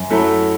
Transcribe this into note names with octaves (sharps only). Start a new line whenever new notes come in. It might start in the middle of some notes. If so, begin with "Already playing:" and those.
Already playing: F#2
F#3 A3 E4 A4